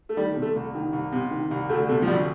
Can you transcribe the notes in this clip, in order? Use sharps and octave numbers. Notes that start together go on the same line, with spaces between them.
A3
D#3 G3
C3
A3
C2
D#3
C2
C3
D#3
C2
D2 A3
C3 A3
F3
D2 G3